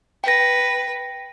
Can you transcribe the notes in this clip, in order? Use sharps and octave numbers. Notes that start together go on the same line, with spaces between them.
B4 G5 A#6